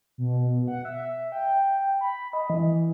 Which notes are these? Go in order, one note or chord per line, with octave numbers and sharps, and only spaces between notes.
B2
F#5
E5
G5
B5
D#5
E3